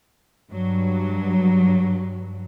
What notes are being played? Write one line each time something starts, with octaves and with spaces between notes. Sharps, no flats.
G2 F#3